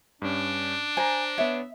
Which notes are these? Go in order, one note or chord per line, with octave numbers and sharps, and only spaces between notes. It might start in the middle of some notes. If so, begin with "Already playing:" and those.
G2 C#4 D4
C5 G#5 A#5
B3 C#5 E5